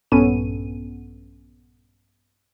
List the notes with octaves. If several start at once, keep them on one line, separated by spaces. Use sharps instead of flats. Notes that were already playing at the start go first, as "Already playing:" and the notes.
A#1 G2 B3 C#4 A4 D#7